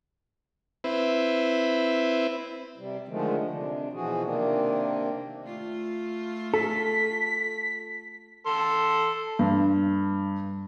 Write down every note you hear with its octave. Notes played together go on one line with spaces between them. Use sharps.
C4 E4 B4
C3 G3
D3 D#3 F3 G#3 A3
C3 D4
B2 E3 F3 F#4 G#4
C3 D#3 A#3 C4 D4
A3 F4
A4 B6
A4 C6
G2